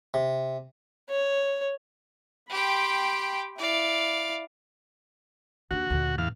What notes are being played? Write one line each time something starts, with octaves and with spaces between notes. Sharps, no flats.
C3
C#5
G4 G5 B5 C6
E4 D5 F5
D#2 D4 F#4
D2 A#2
A1 E2 F5